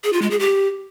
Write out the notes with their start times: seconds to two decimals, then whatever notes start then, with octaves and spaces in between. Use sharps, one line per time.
0.04 G#4
0.13 F4
0.22 G#3
0.31 G#4
0.39 G4